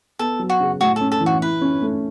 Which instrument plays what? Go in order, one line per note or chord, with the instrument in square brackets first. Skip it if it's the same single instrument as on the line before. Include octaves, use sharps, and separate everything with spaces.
[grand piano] B3 [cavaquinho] A4
[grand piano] F#3
[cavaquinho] F#4
[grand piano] C#3
[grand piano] A2 [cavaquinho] F#4
[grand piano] C#4 [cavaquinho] A4
[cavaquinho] A4
[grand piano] E3
[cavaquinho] F#4
[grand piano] E4 [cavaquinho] B4
[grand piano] C#4
A3